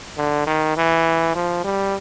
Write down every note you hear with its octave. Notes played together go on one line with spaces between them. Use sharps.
D3
D#3
E3
F3
G3